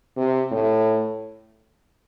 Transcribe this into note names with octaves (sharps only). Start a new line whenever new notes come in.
C3
A2